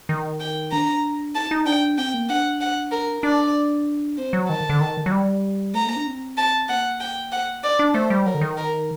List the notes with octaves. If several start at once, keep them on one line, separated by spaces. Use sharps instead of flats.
D#3
G5
D4 A#5
D#4 A5
D#4
D4 G5
C4 G5
A#3
D4 F#5
F#5
A#4
D4 D5
C4 C5
F#3
D#3 A5
D3
D#3
F#3
G3
A3 A#5
A#3
D4
C4
A5
A#3 F#5
G5
F#5
D4 D5
D4
A3 C5
G3
F#3 A#4
D3
D#3
A#4